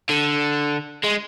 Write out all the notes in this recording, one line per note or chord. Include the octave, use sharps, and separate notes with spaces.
D3
G#3